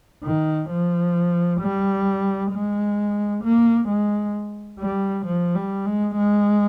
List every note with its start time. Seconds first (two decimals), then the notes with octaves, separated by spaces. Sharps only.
0.24 D#3
0.70 F3
1.61 G3
2.52 G#3
3.43 A#3
3.88 G#3
4.80 G3
5.26 F3
5.55 G3
5.86 G#3
6.17 G#3